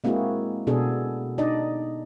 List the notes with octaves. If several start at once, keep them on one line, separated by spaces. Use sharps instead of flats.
G#3 A#3 C4 E4 F#4 G#4
B2 B3 D4 G#4 A4
D4 D#4 D5 D#5